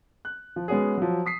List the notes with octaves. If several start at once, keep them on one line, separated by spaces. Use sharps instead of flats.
F#6
F3
G#3 B3 C#4 F#4 G#4
F3 F#3
D#6 B6 C7